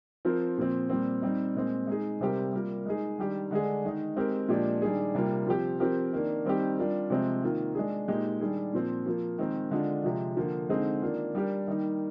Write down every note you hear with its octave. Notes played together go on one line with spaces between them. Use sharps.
F3 C4 F4 A#4
A#2 F3 C4
A#2 G3 C4
G3 C4 D#4
A#2 G#3 C4
G#3 D#4 G#4
C3 G3 C4 G4 A#4
G3 A#3 F4 A#4
G#3 D#4 G#4
D#3 G3 D4 G4
D3 G#3 D4 G#4
D#3 G#3 D#4
G#3 C4 G4 A#4
A#2 F3 G#3 D4 G4
D#3 G3 D4 G#4
C3 G3 A#3 F4
F3 C4 G4
F3 C4 G4 A#4
D#3 A#3 D4
D#3 G3 C4 D#4 G4
G3 D4 F4 A#4
C3 F3 G#3 C4
D#3 A#3 F4
G#3 D4 G#4
A#2 G#3 D#4 G4
D#3 G3 D4 G#4
A#2 F3 C4
F3 A#3 F4
D#3 G#3 C4 D#4
D3 G#3 D4 F4
C3 F3 G#3
D3 F3 A#3
D3 G#3 C4 D#4 G#4
D#3 A#3 D4 F4
G3 D4 G4 A#4
D#3 G3 A#3 D#4